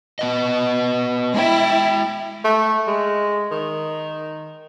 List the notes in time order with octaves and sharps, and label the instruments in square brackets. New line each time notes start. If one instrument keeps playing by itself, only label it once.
[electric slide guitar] B3 B4 D#5
[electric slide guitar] G#3 G5 [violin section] E4
[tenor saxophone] A3
G#3
D#3